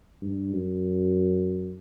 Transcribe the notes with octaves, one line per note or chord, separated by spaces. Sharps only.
G2
F#2